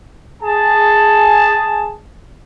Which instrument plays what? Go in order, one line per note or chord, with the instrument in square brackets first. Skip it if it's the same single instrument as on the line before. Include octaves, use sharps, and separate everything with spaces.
[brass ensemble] G#4 A5